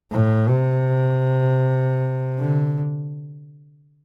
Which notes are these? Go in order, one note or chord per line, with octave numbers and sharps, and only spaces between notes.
A2
C3
D3